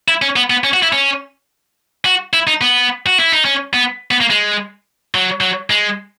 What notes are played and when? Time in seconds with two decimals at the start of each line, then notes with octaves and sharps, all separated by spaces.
0.08 E4
0.22 C#4
0.36 B3
0.50 B3
0.64 C#4
0.74 F#4
0.83 E4
0.93 C#4
2.05 F#4
2.33 E4
2.47 D#4
2.61 B3
3.06 F#4
3.19 E4
3.32 D#4
3.45 C#4
3.74 B3
4.11 B3
4.21 A#3
4.30 G#3
5.15 F#3
5.41 F#3
5.70 G#3